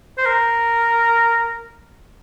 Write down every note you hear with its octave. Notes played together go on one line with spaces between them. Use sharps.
C5
A#4